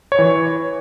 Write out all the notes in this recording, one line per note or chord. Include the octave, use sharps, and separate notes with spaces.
C#5
E3